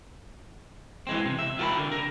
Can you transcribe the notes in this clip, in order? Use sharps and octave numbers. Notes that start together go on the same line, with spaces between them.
E3 G#3 C4
C3
E5
F4 G4 A#4 F#5 B5
D3
A#4